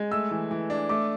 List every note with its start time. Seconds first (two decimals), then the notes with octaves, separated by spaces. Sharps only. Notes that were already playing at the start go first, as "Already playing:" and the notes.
Already playing: G#3
0.11 A3 E6
0.31 E3
0.51 E3
0.70 D4
0.89 A3 D6